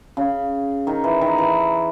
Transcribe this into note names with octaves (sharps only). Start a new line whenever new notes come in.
C#3
D#3
E3
D#3
E3